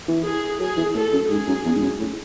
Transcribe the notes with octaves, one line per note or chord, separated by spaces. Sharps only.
E3
G#4
F#3 G#4
E3
A2 A4
F#2
G#2 G#4
F#2
E2
G#2
F#2
A2